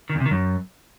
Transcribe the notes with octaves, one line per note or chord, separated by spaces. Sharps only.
D#3
E2
C3
D#3
F#2